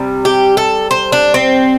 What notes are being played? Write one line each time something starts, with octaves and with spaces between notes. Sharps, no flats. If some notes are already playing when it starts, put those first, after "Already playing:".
Already playing: C3 G3
G4
A4
C5
D4
C4